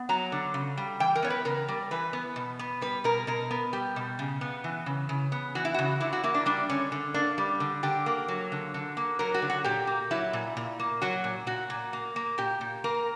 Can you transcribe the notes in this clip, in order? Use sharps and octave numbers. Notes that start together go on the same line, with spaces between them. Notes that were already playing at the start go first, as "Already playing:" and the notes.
Already playing: B3
F#3 A#5
D3
C#3
G3
E3 G5
A#4
B3 C#5
B4
C#3 A#4
G3
E3 B4
B3
B2
B3
G3 B4
B2 A#4
B2 A#4
B3
G3 G4
B2
C#3
B3
E3
C#3
C#3
B3
E3 F#4
E4
C#3 F#4
D3 E4
F#4
A#3 E4
D4
G3 D4
D3 C#4
D3
A#3 D4
G3
D3
D3 G4
A#3
F#3
D3
D3
A#3
F#3 A#4
F#4
D3
F#4
A#2 G4
A#3
F#3 E4
A#2
A#2
A#3
F#3 F#4
A#2
A#2 F#4
A#2
A#3
A#3
A#2 G4
A#2
A#3 A#4